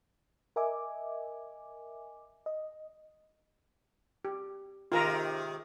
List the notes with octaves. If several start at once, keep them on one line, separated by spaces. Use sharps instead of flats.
A#4 D#5 E5 G#5 D6
D#5
G4
G#2 C3 D#3 F4 A#4 A#5